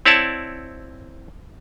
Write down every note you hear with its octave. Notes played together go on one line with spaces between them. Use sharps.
C4 E4 C#5 D5 F#5 A5